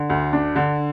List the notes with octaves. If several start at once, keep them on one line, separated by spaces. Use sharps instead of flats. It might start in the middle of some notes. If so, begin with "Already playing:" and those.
Already playing: D3
D2
D4
D3